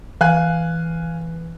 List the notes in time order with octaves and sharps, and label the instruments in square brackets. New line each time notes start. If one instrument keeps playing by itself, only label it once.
[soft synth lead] E3 [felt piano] F5 G#5 F#6